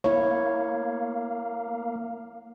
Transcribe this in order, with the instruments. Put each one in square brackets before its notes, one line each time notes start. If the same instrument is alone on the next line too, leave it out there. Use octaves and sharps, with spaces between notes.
[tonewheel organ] A#3 [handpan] E4 C#5